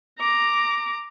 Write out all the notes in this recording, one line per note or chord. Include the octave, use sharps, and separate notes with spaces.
A#5 D6